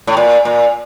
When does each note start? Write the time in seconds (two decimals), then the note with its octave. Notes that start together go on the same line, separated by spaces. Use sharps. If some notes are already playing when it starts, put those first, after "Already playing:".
0.07 A2
0.17 A#2
0.45 A#2